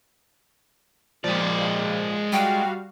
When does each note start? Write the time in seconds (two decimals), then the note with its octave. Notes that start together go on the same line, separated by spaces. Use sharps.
1.24 A#2 F3 G#3 D5
2.32 G3 F#4 F5 G5